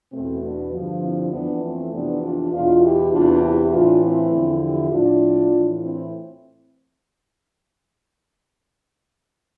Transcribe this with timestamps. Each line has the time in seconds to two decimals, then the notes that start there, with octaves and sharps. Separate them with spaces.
0.12 E2 B2 A3 C4
0.42 B3 D4
0.72 G2 D3 F3
1.02 C4 E4
1.32 F2 E3 B3 D4
1.63 A3 C4
1.92 F2 C3 E3 B3 D4
2.22 D4 F4
2.52 E2 B2 D4 F4
2.82 E4 G4
3.12 E2 C3 E3 D4 F4
3.42 E4 G4
3.72 A2 E3 D4 F4
4.02 C4 E4
4.32 E2 D3 F3
4.62 E4 G4
4.92 A2 F3 D4 F4
5.52 A2 E3
5.81 C4 E4